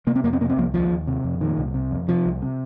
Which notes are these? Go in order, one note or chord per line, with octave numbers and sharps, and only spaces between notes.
C3 A#3
C4
F2 A#3
C4
C3 A#3
C4
C2 F3 A#3
D#2 F3
D#2
C3
F2
A#2 D#3
C2
C3
F2
C3 F3
C2
C3